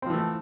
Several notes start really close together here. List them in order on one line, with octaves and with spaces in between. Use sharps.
C4 F3 E3 A3